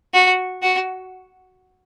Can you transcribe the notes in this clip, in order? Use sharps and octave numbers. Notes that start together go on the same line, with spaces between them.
F#4
F#4